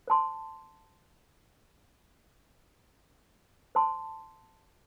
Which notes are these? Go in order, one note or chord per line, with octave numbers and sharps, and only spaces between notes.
C5 A5 C6
C5 A5 C6